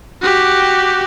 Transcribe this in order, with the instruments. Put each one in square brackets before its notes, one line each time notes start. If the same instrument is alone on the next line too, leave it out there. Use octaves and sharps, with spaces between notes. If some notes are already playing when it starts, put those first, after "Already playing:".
[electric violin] F#4 G4